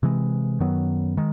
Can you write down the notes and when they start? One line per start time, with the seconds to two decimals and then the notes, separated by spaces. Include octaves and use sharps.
0.03 C3 E3 G#3
0.60 F#2 D#3 F#3 B3
1.17 D#3 G#3